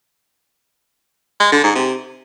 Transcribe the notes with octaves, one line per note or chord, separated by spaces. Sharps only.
G#3
D3
G#2
C3